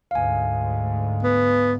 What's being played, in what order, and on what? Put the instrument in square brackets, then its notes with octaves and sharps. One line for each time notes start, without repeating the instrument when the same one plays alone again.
[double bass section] D2 G#2 [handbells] F5 G#5
[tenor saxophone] B3